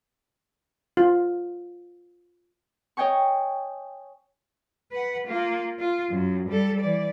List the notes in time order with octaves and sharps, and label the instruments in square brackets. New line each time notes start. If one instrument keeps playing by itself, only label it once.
[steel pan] F4
[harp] C#5 D#5 G5 G#5 C#6
[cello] B4 F#5
A#3 F4
F4
F#2
G3 A4
E3 D5